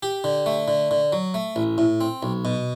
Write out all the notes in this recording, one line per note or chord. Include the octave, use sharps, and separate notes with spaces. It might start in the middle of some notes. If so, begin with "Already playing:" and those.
G4
D3
A3
D3
D3
F#3
A3
A1
A2
C4
B1
B2